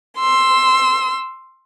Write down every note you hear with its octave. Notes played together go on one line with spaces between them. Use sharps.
C6 E6